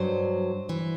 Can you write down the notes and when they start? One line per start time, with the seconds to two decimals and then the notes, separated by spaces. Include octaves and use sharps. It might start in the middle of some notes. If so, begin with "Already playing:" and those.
Already playing: G2 F#3 C5
0.69 E3